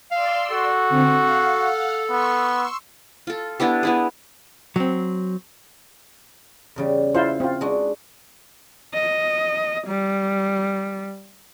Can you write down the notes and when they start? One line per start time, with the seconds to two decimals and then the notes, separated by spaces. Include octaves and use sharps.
0.11 D5 F5 C6 E6
0.51 F#4 A4
0.89 D3 C4
1.21 F5 F#5
2.11 B3 C6 C#6 E6
3.27 F4 A4
3.60 B3 D4 E4 G4
3.83 B3 E4 G#4
4.76 F#3 C4
6.76 E2 C#3 G3
7.14 E4 F4 C5 F#5
7.40 C4 F4
7.61 G#3 D4 F#4
8.94 D#5
9.87 G3